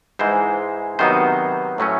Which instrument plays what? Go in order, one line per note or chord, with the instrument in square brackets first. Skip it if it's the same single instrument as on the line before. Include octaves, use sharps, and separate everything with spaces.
[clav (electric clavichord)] G#2 E3 G#3 C5
C3 D#3 F#3 B3 D#4 C5
A2 F#3 A3 C#4